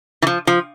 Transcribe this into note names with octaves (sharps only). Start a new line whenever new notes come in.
E3
F3
F3